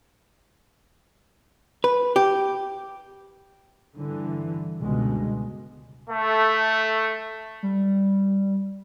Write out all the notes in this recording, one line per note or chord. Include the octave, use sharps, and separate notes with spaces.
B4
G4
G2 D3 E3
C#2 G2 B2 D3 G#3
A3
G3